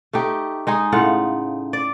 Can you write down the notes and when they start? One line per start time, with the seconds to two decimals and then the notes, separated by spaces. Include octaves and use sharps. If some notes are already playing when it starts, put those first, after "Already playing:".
0.13 A3 D#4 G4
0.67 G#3 D#4 G#4
0.92 A2 C#3 F4 F#5
1.73 D5